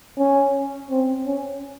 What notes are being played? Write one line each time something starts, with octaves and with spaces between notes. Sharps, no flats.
C#4
C4
C#4